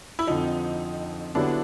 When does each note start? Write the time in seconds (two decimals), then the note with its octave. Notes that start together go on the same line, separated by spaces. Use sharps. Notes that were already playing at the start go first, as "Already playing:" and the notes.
0.19 E4
0.27 F2 D3 F3 D#4
1.35 D3 F#3 B3 D4 E4 G4